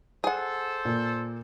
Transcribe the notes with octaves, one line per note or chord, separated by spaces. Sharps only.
G#4 A4 C5 F#5
A#2